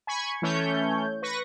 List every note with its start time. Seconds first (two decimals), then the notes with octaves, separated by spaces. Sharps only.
0.07 G#5 B5 C#6 G#6
0.42 E3 A3 C#4 C#5 G6
1.22 B4 C#6 A#6